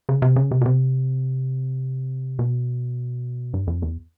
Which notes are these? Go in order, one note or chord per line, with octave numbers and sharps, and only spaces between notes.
C#3
C3
C#3
C3
B2
C3
B2
G2
F2
E2